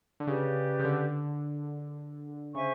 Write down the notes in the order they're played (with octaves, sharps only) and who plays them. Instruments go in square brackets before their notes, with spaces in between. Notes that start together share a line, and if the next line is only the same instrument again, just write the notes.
[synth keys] D3
[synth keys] C#3 [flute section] G4 B4 D5
[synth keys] C#3
D3
[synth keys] C#3 [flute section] C5 E5 G#5 C#6